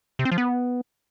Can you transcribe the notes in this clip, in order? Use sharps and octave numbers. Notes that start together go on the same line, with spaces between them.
C3
C4
F3
B3